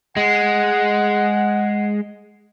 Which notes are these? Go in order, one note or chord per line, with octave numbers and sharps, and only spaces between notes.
G#3 F#5